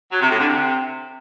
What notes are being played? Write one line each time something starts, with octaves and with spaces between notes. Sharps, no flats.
F#3
C3
A2
D3
C3